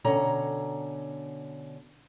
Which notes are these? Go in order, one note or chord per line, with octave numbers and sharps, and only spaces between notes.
B2 D3 C#4 A#5